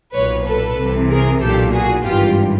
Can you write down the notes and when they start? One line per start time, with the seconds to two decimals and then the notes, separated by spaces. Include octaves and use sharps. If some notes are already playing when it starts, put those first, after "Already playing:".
0.14 B1 A#2 B4 C#5
0.46 A4 B4
0.78 C2 C3 E3
1.10 G#4 A#4
1.41 B1 A#2 G4 A4
1.73 F#4 G#4
2.05 G#1 G2 E3 F4 G4